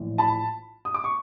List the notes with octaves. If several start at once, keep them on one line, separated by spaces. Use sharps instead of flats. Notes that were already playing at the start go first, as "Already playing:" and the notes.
Already playing: A#1 A2 E3
A5 B5
D#6
D6
C#6